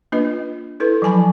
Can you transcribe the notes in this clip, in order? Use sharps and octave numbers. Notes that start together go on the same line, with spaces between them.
A#3 D4 F4 B4 D#5
E4 A4 B4
F3 F#3 G#5 A5 B5